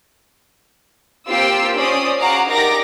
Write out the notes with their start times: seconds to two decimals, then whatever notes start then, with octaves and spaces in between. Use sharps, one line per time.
1.28 A#3 C4 F4 G4 G5 E6
1.75 C#4 C5 D5 D#6
2.20 F#4 G#4 F5 F#5 A#5 D6
2.49 D#4 G4 A#4 D5 D6 A#6